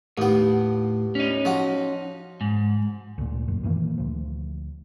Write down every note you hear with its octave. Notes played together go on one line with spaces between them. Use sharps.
D#2 A2 B3
C#4 D#4
F3 F#4
G#2
D2 A#2
F1 F#2
A#2 D#3 E3 A#3
D2 F3